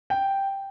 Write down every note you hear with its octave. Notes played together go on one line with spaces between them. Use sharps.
G5